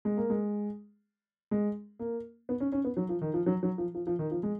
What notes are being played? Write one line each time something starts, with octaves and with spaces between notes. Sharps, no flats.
G#3
A#3
G#3
G#3
A#3
B3
C#4
C#4
B3
F#3
F3
D#3
F3
F#3
F#3
F3
F3
F3
D#3
F3
G#3